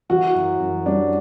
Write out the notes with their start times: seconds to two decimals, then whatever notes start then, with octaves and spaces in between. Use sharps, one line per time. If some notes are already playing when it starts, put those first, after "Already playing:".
0.09 E3 F#4
0.34 F#2
0.60 F#2
0.86 G3 D4